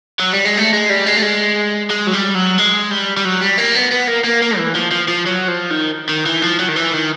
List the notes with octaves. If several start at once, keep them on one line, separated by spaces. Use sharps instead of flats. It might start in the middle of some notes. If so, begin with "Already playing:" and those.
F#3
G3
G#3
A3
G#3
G3
G#3
A3
G#3
G#3
F#3
G3
F#3
G#3
G3
G3
F#3
G3
A#3
B3
B3
A#3
A#3
A#3
E3
F3
F3
F3
F#3
F3
D#3
D#3
E3
F3
F#3
D#3
E3
D#3